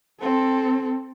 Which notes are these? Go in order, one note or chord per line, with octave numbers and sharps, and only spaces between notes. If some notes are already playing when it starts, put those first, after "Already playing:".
C4 A4